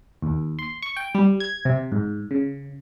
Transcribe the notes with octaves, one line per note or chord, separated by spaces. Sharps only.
D#2
C6
C#6
G5
G3
G#6
C3
G#2
C#3